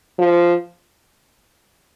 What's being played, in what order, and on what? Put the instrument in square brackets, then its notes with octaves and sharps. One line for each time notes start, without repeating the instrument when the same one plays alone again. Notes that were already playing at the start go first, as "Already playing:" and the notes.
[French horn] F3